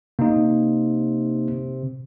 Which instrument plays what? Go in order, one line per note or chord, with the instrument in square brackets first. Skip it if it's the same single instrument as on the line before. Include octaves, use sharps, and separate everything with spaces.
[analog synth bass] C3 [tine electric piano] A#3 D#4